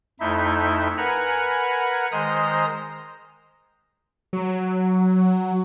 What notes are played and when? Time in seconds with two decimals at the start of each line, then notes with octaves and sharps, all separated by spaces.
0.20 F2 A3 D#4 E4 E5 G6
0.97 A#4 B4 F#5 G#5 A#5 B5
2.12 D#3 G#3 C5 D#5 A#5 D#6
4.33 F#3